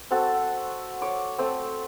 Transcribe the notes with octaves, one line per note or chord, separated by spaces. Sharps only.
C4 F#4 A4
C#5 D6
A3 C4